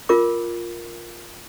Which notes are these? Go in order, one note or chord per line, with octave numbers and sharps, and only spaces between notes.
F4 A#4 D6